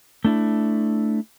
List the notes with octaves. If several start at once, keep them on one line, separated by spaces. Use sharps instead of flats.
A3 D4 E4